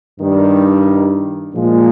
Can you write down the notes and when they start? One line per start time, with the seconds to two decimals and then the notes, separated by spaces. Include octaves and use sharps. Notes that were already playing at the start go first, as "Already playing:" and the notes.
0.19 G2 D#3 G3
1.54 A#2 F3 G#3